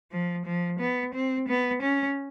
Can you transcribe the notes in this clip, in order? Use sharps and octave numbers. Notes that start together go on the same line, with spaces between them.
F3
F3
B3
C4
B3
C#4